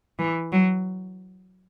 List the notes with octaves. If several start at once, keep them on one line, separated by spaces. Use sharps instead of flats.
E3
F#3